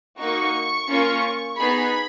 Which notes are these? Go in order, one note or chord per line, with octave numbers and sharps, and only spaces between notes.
A#3 D#4 F#4 C#6
A#3 C#4 F4
B3 D#4 G#4 B5